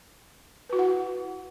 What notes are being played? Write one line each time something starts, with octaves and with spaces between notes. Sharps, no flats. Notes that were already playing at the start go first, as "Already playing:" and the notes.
E4 F#4 B4 F#5